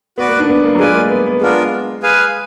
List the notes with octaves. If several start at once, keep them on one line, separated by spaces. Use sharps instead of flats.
B3 F#4 B4 D5 F#5
A#3
D4
B3
A#3
F#3
G#3 F4 B4 D5 G#5
A#3
B3
B3
G#3 B3 D4 F4 A#4
G#4 B4 F5 G#5